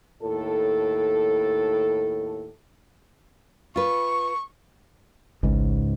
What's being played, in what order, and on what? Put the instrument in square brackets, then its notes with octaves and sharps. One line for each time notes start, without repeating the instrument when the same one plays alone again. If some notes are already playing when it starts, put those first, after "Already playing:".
[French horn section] D#2 A2 A4
[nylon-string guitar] F4 B4 [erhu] C#6
[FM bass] G#1 [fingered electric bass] C#2 G#2